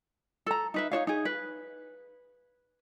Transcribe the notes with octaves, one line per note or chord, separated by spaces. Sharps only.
A4 A#5
D#4 B4 E5
D#4 F#4 C#5 F5
D#4 G#4
B4